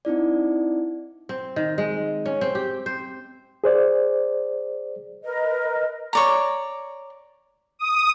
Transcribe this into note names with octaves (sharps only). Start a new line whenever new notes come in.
C4 D#4 E4 D5
C4
D#3
G#3
C#4
C4
G4
C5
G#4 C5 D5
A#4 B4 D#5
C#5 D5 A#5
D#6